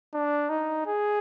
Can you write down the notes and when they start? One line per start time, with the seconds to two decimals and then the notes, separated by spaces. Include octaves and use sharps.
0.14 D4
0.49 D#4
0.86 G#4